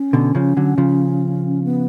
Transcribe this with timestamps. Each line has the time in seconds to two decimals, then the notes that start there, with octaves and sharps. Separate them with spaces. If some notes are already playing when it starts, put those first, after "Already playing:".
Already playing: C#4
0.13 B2 D3
0.35 C#3 F3
0.57 D3 F#3
0.78 C#3 F3
1.64 B3